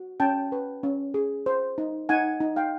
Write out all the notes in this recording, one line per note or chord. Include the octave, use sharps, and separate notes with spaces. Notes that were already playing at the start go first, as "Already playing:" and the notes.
Already playing: F#4
C#4 G5 A5
B4
C#4
G#4
C5
D#4
D#4 F#5 G#5
D#4
F5 G5